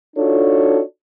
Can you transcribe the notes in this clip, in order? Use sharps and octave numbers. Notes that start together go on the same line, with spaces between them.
D4 D#4 F4 F#4 A4 C#5